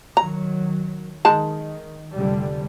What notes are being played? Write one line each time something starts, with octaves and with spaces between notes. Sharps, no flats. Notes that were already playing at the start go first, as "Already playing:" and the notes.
D#3 F#3 A#5
D#3 G#3 D#4 A5
F1 D3 G3